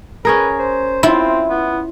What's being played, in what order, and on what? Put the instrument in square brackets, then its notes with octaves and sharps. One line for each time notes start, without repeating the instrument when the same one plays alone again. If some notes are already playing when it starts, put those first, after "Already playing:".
[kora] C#4 G#4 A#4 [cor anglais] B4
[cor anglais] C5
[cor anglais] C4 [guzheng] E4 [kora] F4
[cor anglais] B3